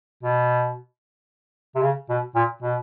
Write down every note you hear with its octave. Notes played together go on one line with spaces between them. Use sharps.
B2
C3
C#3
B2
A#2
B2